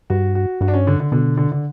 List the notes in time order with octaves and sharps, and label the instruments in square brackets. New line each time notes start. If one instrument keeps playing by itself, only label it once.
[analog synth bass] G2 [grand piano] F#4
[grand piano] F#4
[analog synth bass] G2 [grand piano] F#4
[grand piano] D4
C#4
D3
D3
[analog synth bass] B2 [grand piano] D3
[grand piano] D3
D3